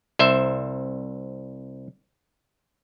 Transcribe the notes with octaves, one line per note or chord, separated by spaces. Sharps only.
C2 C5 E5